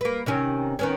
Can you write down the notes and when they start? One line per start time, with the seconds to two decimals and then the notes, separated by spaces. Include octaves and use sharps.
0.01 A#3 B4
0.26 C3 D#3 C#4
0.79 D#3 B3 C#4